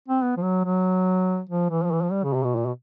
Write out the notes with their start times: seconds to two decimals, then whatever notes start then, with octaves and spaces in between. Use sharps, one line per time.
0.08 C4
0.22 B3
0.37 F3
0.43 F#3
0.64 F#3
1.49 F3
1.70 E3
1.84 F3
1.91 E3
2.01 F3
2.12 G3
2.24 C#3
2.34 C3
2.44 B2
2.56 A#2
2.66 B2